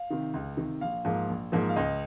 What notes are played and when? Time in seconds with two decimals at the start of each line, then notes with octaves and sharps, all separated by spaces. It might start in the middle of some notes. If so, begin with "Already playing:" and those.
Already playing: F5
0.10 C3 D#3
0.34 C#2
0.57 C3 D#3
0.81 A#1 F5
1.05 G#2 F3 A#3
1.29 A#1
1.52 G#2 F3 A#3
1.69 F5
1.76 C#2 D#5